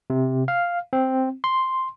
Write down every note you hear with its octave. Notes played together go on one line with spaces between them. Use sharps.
C3
F5
C4
C6